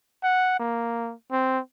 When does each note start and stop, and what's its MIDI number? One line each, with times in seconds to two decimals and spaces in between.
0.23 0.58 78
0.60 1.14 58
1.32 1.59 60